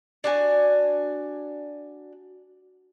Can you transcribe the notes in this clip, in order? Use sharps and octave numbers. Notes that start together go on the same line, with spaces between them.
D4 F#4 G#5